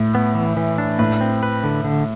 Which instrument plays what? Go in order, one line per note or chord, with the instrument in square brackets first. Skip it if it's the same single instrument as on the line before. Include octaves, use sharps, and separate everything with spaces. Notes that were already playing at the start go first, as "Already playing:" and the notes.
Already playing: [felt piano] A2
[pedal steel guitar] B3
E3
E3
D4
[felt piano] A2 [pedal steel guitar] B4
[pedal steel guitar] C4
B4
D3
D3